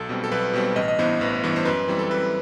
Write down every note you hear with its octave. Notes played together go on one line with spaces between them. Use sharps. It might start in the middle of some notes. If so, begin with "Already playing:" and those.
Already playing: B1 A4
B2 G3 C4
A4
B1 B4
B2 G3 C4
A1 D#5
D#5
G2 E3 B3 C5
A1 B4
G2 E3 B3
C5
F#2 B4
E3 G3 C4
A4
F#2 B4